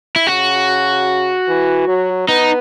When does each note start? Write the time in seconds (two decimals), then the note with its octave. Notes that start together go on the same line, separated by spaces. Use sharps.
0.16 E4
0.27 C#3 F#4
1.48 E3
1.88 F#3
2.28 B3 D#4